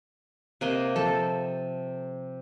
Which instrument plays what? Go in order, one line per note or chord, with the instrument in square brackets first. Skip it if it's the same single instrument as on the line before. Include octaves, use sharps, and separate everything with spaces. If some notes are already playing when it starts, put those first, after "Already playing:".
[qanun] C3 A#3 D#5 [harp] F#6
[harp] F3 G6 E7 [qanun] A4